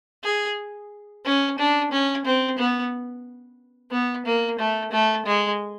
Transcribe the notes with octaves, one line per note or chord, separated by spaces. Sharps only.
G#4
C#4
D4
C#4
C4
B3
B3
A#3
A3
A3
G#3